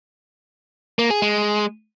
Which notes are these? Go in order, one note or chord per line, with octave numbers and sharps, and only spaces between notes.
A#3
G#4
G#3